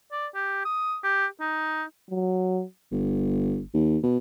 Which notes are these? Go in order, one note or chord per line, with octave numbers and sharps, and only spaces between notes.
D5
G4
D#6
G4
D#4
F#3
G1
D#2
B2